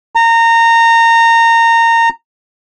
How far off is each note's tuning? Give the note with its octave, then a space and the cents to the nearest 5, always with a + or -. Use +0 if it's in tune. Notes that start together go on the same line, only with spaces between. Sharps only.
A#5 -20